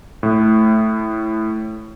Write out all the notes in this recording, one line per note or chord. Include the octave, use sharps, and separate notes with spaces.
A2 A3